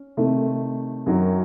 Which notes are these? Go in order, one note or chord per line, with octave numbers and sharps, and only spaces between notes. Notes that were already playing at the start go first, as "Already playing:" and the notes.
Already playing: C#4
C3 D#3 A3
F#2 D#3 F#3